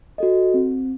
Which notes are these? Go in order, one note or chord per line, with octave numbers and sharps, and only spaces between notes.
F#4 A4 D#5
C4